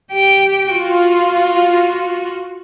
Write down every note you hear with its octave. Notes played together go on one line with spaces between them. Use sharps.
G4 G5
F4 F#4